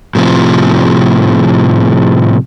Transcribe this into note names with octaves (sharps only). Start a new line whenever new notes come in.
A2 C3 F3